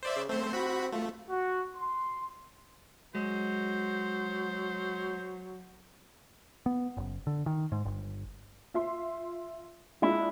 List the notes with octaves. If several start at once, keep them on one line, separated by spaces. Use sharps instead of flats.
C5 D5 E5
C#3
A3 C4 C5
F#4 B5
A3 F4
F#4
C6
F#3 G#3 C5
B3
F#1
D3
D#3
G#2
G1
F4 E5 C6
G#3 D4 E4 F4